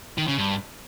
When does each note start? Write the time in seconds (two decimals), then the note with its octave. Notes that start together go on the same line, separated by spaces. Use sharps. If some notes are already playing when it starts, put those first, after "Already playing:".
0.18 D#3
0.28 C#3
0.38 G2